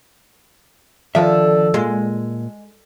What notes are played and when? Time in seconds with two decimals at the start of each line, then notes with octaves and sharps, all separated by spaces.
1.15 D3 D#3 F3 E5
1.74 A#2 G#3